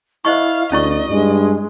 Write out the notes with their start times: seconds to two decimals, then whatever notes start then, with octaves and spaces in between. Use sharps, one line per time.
0.25 E4 C5 D#5 F5 C#6
0.72 D2 C#4 E4 D5 D#5 C#6
1.09 G2 G#3